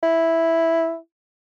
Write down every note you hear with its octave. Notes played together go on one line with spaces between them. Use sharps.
E4